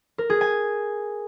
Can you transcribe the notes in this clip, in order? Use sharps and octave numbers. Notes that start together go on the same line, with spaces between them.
A#4
G#4
G#5